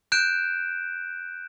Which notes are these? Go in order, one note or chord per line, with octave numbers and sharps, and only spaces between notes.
F#6 G6 D7 E7